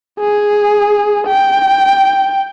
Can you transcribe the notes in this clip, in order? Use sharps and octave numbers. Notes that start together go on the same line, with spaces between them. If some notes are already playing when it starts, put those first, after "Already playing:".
G#4
G5